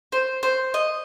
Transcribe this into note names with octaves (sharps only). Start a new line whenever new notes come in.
C5
C5
D#5